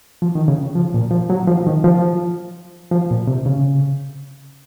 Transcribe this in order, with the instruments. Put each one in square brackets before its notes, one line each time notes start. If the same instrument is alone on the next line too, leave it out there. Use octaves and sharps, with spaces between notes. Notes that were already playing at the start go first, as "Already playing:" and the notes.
[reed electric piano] F3
D#3
C#3
F3
A#2
F3
F#3
F3
D#3
F3
F3
A#2
C3
C#3